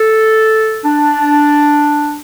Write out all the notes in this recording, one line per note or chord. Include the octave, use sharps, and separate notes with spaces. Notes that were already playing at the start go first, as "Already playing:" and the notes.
Already playing: A4
D4